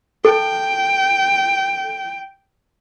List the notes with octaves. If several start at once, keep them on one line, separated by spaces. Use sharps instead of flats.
A4 G5